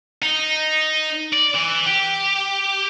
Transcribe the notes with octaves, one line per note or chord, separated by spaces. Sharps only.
D#4
D5
E3
G4